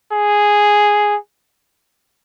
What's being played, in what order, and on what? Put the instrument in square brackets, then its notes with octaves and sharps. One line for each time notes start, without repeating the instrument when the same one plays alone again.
[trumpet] G#4